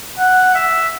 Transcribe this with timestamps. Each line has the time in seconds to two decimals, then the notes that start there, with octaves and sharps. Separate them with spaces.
0.19 F#5
0.55 E5